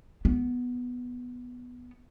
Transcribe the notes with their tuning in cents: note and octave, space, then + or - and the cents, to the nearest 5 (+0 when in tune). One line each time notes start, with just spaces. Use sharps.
B3 +0